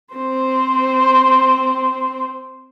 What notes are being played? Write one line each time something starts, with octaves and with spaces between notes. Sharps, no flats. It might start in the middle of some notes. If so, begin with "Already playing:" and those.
C4 C5